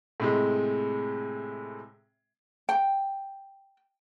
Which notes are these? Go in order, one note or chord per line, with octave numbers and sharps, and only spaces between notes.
A2 C3 G#3
G5